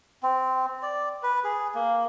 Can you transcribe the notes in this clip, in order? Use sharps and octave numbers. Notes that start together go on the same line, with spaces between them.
C4
D5
B4
G#4
A#3